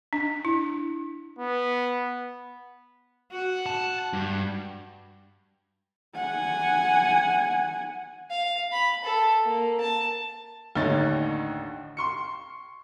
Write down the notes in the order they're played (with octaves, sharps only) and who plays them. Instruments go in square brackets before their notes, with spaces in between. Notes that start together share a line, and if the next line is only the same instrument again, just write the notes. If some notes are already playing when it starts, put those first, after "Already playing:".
[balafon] D4
E4
[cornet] B3
[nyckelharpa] F#4 F#5
[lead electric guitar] A5
G2
[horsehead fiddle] F#5 G#5
[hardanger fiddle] F5
B5
A4
A#3
A5
[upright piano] A1 D#2 D3 D#4 C#5 A6
C6 C#6 C#7